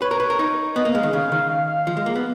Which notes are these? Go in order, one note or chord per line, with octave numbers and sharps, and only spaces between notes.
B4 C#5
A#4
B4
A#4
D#4
B3 D#5
A#3
G#3 F5
D#3
C#3 F5
D#3 F5
F5
F5
F3
G#3
A#3
B3